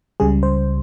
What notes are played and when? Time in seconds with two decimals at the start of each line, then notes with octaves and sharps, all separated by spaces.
0.20 C#2 C#3 G3 G#4
0.43 C5